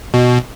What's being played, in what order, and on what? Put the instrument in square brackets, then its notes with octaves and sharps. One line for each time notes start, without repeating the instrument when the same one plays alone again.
[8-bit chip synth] B2